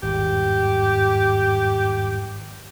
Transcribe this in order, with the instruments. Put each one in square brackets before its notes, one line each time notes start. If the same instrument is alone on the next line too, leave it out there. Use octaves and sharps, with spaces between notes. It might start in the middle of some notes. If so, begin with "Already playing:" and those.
[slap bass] G#1 E2 G2 [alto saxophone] G4